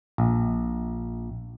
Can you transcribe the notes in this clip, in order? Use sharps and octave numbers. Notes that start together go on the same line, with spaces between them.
A#1